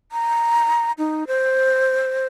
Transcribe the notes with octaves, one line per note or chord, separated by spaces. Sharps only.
A#5
D#4
C5